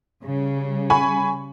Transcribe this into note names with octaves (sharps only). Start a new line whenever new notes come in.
C#3 G3
G#5 B5 C#6